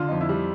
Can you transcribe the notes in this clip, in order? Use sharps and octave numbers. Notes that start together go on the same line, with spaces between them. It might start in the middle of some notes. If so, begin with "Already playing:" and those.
Already playing: D3 F4
F2 D#4
E4
G3